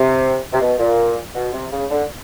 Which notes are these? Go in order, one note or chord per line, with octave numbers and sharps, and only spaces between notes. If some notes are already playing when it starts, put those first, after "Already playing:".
Already playing: C3
C3
B2
A#2
B2
C3
C#3
D3